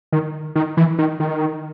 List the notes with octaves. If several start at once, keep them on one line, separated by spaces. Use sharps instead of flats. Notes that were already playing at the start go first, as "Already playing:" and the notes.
D#3
D#3
E3
D#3
D#3